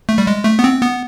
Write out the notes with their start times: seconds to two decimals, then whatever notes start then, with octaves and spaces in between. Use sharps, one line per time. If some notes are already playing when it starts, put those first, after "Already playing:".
0.09 A3
0.18 G3
0.27 G#3
0.45 A3
0.59 B3
0.64 C4
0.82 B3